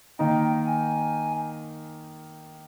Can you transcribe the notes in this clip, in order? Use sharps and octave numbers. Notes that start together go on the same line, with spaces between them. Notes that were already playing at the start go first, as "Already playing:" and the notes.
D#3 A#3 D#4 G5
G#5